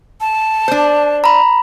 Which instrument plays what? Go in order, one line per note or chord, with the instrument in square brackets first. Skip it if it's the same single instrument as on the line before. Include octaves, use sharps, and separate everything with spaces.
[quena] A5
[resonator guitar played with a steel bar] D4 C5
[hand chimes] A#5 B5